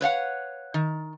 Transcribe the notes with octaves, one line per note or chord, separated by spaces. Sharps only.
B4 C#5 F5 F#5
D#3